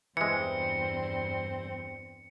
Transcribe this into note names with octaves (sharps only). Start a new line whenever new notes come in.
E2 G2 E3 G#3 C4 C#7